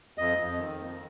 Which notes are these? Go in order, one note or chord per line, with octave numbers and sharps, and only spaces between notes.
F2 D#5
F2
D#3
F2